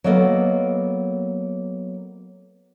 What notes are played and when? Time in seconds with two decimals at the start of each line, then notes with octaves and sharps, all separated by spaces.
0.04 F#3 A#3 B3 A4 D#5